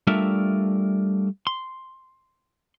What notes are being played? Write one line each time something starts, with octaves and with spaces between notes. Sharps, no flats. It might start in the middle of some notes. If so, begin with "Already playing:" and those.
G3 A3 D4 F4 A#4 E5
C6